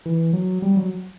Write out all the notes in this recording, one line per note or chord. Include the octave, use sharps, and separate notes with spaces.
E3
F#3
G3
F#3